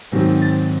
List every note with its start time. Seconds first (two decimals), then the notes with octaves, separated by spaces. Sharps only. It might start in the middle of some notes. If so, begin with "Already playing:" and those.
0.12 G#2 D#3 F#3 C4
0.42 A6